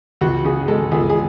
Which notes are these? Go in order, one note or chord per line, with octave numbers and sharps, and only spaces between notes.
C#2 F#4
C#3 G#4
G#3 A4
C#2 G#4
G#4